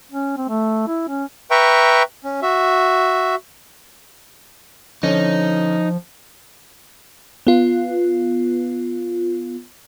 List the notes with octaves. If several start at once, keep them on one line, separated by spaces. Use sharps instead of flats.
C#4
C4
A3
E4
C#4
B4 E5 G5 A#5 C#6
C#4
F#4 E5
D3 F3 C#4 D#4
B3 F4